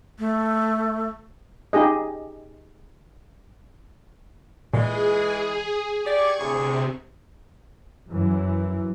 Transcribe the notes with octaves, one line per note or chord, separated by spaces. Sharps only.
A3
D#4 G4 G#4 D#5
A#2 E3 G#3 G#4
G4 D5 C#6 G#6
D2 A2 C3 G#4
F#2 E3